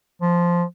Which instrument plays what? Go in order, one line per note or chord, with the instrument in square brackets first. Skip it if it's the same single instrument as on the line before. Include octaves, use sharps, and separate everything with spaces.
[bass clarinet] F3